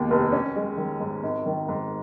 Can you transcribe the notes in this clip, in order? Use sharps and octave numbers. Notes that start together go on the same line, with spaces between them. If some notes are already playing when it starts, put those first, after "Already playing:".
Already playing: D#2 B2 D#3 G#3
F1
C#4
G#3
D#3
G#2
G#1
D#3
G#2